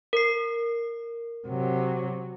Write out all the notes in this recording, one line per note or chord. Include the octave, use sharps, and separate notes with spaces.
A#4 C7
C3 F#3